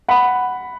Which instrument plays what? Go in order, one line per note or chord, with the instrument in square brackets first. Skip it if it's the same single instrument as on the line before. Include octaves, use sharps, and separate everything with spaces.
[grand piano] F#5 B5